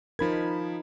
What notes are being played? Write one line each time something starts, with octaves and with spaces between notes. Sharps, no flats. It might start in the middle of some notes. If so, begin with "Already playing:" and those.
F3 D#4 A#4 B5 G#6